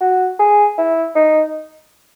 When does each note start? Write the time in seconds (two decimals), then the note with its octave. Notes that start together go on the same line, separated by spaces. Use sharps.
0.01 F#4
0.39 G#4
0.78 E4
1.15 D#4